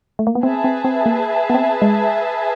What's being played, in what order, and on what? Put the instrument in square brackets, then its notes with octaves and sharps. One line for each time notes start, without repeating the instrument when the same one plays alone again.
[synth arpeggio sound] A3
A#3
B3
[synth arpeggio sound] C4 [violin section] G#4 B4 E5 A5
[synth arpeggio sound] C4
C4
A#3
B3
C4
G#3